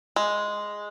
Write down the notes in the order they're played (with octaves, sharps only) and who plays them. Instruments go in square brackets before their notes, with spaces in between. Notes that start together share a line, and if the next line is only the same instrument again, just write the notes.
[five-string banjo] G#3